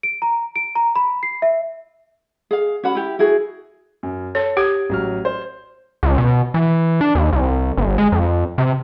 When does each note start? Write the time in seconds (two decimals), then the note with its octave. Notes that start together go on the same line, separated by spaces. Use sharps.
0.03 D7
0.22 A#5
0.56 D7
0.76 A#5
0.96 B5
1.23 C7
1.42 E5
2.51 G#4 F5
2.84 C#4 F#4 F#5 B5
2.95 E4 G4
3.19 E4 F#4 G#4
4.03 F#2
4.35 A4 C#5
4.57 G4 D#6 G#6
4.89 A1 F#3 F6
5.25 C5
6.03 C#2
6.18 B2
6.54 E3
7.01 D4
7.15 D#2
7.33 C2
7.77 G1
7.98 G#3
8.12 F2
8.58 C3